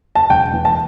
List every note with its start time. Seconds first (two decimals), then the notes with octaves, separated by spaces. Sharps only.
0.15 A5
0.30 E1 G5
0.53 E3
0.65 A5